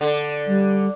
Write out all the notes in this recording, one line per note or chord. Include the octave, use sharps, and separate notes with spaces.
D3
G3